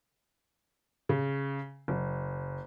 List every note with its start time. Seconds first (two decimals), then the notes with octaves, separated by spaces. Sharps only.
1.09 C#3
1.88 F#1